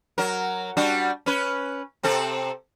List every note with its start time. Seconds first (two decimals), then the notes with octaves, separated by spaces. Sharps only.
0.18 F#3 A#4
0.77 G3 D4 F#4
1.26 C#4 B4
2.03 C3 C4 A4